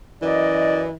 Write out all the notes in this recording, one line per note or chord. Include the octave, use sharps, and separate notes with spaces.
F#2 E3 D5 D#5